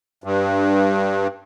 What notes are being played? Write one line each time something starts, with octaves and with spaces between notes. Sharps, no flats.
G2